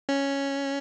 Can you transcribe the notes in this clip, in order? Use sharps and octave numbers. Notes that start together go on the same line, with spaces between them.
C#4